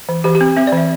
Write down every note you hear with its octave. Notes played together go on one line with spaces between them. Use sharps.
E3
E3 G4
G4
C4
C4 E5
D5
E3 E5